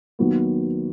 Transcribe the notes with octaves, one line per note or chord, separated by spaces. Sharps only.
D#2 D#3 F#3 B3